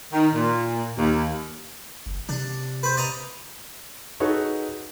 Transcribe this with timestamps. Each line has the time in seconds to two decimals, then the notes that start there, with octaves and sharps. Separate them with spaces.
0.13 D#3
0.34 A#2
0.98 D#2
2.06 F#1
2.29 C3 D4
2.83 B4 C5
2.97 D5 D#5 A#5
4.20 D#4 F#4 G#4 A4 B4 C#5